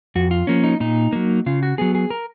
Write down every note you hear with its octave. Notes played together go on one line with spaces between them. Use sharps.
F2 F#4
F4
F3 A#3 C#4
D#4
A#2 D#4
F#3 A#3
C#3 F4
F#4
F#3 B3 G#4
G#4
A#4